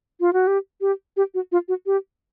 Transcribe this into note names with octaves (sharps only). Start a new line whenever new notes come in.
F4
F#4
G4
G4
G4
F#4
F4
F#4
G4